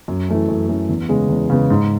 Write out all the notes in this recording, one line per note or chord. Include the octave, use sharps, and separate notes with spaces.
F#2
E3 A3 C#4
F#2
E3 A3 C#4
E2
C#3 G#3 B3
E2
C#3 G#3 B3
G#2